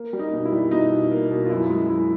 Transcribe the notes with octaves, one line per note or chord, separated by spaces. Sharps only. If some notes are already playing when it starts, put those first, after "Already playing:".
Already playing: A#3
G3
D#4
B2
E4
G3
B2 D#4
B2
A#3
B2
F4
F#2 E4
G#3
F#2 E4